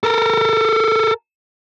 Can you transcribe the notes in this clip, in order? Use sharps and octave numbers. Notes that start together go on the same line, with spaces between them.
A4 A#4